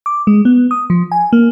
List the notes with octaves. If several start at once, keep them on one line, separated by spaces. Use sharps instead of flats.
D6
G#3
B3
D#6
F3
G#5
A#3